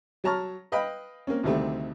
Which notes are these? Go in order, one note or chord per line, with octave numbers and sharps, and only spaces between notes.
F#3 C#5 A5 A#5 C#6 F6
B4 D#5 F5 G5 B5
A#3 C4 C#4
D2 C3 D#3 G3 A3 C4